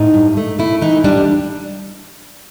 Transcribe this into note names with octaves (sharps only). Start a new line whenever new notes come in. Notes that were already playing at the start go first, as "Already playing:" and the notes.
Already playing: A2 D#4
G2
A3
A3 E4
E3 D#4
G3 D4